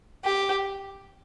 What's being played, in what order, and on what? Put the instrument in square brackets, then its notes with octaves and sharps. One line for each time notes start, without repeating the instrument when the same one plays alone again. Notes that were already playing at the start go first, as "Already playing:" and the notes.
[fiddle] G4